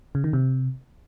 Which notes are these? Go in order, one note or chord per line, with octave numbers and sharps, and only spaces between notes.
C#3
D#3
C3